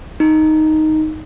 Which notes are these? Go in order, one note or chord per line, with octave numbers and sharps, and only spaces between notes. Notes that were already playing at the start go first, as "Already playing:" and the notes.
D#4